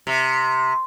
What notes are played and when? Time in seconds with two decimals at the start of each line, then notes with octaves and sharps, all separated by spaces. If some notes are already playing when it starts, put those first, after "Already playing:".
0.07 C3